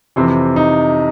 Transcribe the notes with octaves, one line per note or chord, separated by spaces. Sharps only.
F2 C3 E3 C4
D#4